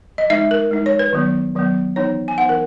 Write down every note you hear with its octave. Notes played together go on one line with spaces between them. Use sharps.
D#5
G#3 D#4 E5
A#4
G#3 D#4
C#5
B4
D#3 F#3 B3
D#3 F#3 B3
E3 B3 D#4 C#5
G#5
E3 B3 D#4 F#5
A#4